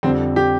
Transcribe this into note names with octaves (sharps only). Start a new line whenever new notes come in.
F2 D3 G3 C4
G4